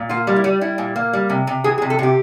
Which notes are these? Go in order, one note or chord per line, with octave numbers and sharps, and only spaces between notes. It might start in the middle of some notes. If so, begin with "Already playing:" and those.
Already playing: A#2
A#3 F4
G3
E4
G3
G3 E4
A#2
A#3
G3
C3
C3
E3 G#4
G#4
C3
A4
C3 G4